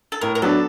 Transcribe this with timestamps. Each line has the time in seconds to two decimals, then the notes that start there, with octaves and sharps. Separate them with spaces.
0.12 A4
0.21 A2 A#4
0.35 A#4
0.42 F#3 B3 D4 A4